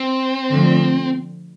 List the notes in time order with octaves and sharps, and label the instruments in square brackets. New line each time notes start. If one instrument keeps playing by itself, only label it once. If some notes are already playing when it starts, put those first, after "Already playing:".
Already playing: [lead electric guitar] C4
[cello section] D3 F3 A3